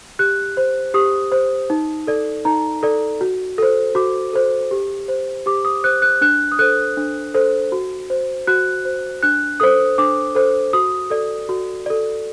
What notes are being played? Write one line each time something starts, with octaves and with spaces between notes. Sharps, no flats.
G4 F#6
C5
G4 D#6
C5
D#4
A4 D5
D#4 A#5
A4 D5
F#4
A4 C5
F#4 D6
A4 C5
G4
C5
G4 D6
D#6
C5 F#6
F#6
D4 F#6
D#6
A4 C5 F#6
D4
A4 C5
F#4
C5
F#4 F#6
C5
D4 F#6
A4 C5 D#6
D4 D6
A4 C5
F#4 D#6
A4 D5
F#4
A4 D5